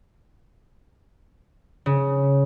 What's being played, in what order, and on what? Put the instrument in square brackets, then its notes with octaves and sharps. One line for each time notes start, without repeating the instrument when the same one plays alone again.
[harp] C#3